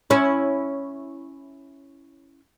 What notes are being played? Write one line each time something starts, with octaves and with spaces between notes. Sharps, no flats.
C#4 E4